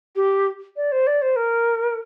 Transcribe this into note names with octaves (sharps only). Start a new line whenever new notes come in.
G4
D5
C5
D5
C5
A#4